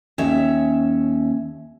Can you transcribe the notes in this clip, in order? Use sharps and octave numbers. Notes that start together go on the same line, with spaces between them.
D#2 C#4 E5